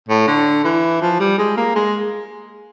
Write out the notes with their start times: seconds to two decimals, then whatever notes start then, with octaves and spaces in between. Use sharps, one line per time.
0.09 A2
0.27 D3
0.64 E3
1.02 F3
1.20 G3
1.39 G#3
1.57 A#3
1.76 G#3